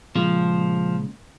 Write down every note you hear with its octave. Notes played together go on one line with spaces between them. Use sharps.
A#2 C#3 F3 G#3